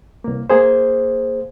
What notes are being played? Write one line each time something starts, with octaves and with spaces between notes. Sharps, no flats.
C2 A#3
A#3 G#4 C5